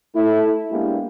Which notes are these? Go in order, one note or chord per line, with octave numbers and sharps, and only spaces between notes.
A3 E4 A4
G#3 A#3 B3 D4 E4 G4